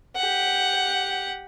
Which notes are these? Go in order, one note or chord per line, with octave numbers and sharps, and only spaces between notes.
G4 F#5